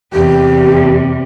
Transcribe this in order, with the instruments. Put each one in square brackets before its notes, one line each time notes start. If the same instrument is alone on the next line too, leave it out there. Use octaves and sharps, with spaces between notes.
[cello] E2 C3 [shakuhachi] G4